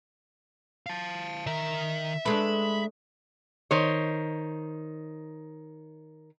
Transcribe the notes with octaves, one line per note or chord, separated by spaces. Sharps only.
F5 A5
D#3 A#4 E5
G#3 A3 D4 B4 B5
D#3 C5 C#5